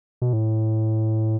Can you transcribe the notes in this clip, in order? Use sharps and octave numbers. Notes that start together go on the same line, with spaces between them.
B2
A2